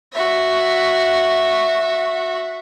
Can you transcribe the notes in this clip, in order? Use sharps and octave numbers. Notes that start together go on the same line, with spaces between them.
F#4 E5